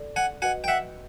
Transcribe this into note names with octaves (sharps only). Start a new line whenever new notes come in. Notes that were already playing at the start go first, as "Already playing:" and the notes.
Already playing: A4 D5
F#5 G#5
F#4 B4 D#5 F#5 G#5
G5
E5 F#5